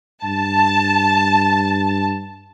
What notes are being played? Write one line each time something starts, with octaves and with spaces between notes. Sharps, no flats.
G2 A5